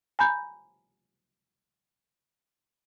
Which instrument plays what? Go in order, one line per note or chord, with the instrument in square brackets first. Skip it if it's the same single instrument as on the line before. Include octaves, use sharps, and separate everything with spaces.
[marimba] G#5 A#5 B5 G6